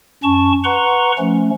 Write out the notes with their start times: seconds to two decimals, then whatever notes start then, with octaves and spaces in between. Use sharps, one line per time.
0.23 F#2 C#4 A5 C#6
0.64 B4 F#5 A#5 C6 C#6
1.18 F3 A3 C#4